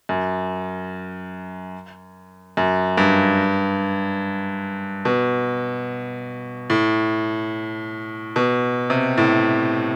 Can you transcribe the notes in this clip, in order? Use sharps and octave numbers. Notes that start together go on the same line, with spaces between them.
F#2
F#2
G2
B2
A2
B2
C3
A2